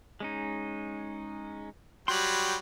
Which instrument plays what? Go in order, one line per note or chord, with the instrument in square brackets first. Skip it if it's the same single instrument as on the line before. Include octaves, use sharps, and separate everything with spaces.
[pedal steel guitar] G#3 C#4 D#4
[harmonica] F#3 G3 G5 [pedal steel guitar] B5 C6